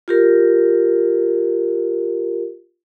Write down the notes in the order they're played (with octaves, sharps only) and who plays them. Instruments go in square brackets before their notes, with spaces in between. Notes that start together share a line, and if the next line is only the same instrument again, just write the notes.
[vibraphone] F4 G4 A#4